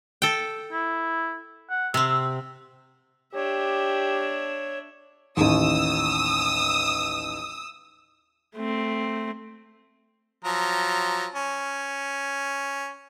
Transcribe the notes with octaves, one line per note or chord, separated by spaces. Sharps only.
A4 G5
E4
F#5
C3 C4 E6
D4 G4 C#5 E5
A1 D#2 D#6 E6
A3 C4
F3 F#3 A#5
C#4